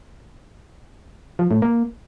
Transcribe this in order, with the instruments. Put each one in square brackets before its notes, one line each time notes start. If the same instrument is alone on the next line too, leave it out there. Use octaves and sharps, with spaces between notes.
[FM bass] F3
A2
A#3